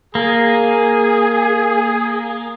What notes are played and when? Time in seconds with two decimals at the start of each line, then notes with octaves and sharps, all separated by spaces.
0.15 A#3 G#4